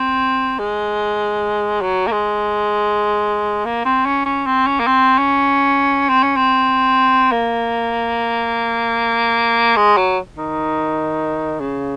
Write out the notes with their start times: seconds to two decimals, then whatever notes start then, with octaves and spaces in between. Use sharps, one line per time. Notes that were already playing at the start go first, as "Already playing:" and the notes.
Already playing: C4
0.59 G#3
1.81 F#3
2.07 A#3
2.11 G#3
3.65 A#3
3.85 C4
4.05 C#4
4.25 C#4
4.46 C4
4.67 C#4
4.80 A#3
4.87 C4
5.18 C#4
6.09 C4
6.23 C#4
6.36 C4
7.32 A#3
9.76 G#3
9.97 F#3
10.37 D#3
11.60 C#3